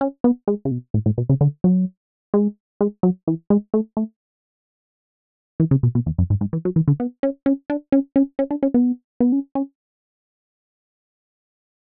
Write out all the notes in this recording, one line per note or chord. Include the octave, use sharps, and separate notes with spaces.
C#4
B3
G#3
C#3
B2
A2
A2
B2
C#3
D3
F#3
G#3
G#3
F#3
E3
G#3
A3
A3
E3
C#3
B2
B2
E2
F#2
G#2
G#2
E3
F#3
E3
D3
B3
C#4
C#4
D4
C#4
C#4
C#4
D4
C#4
B3
B3
C#4
C#4